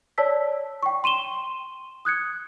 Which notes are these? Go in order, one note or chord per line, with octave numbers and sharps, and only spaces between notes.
C#5 D5 A5 E6 B6
G5 C#6
C6 D#7 E7 G7
D#6 F#6 G#6 C#7